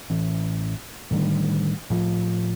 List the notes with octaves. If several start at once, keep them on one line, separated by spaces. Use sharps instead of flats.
A1 E3
A2 D3 D#3 G3
A2 F3